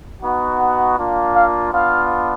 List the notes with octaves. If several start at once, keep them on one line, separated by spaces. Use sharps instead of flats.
B3 D#4 F#4
F#5
A#3 D4 F4
F5
B3 D4 F4 F5